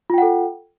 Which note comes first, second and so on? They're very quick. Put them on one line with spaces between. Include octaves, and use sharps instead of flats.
F4 G5 F#5 A4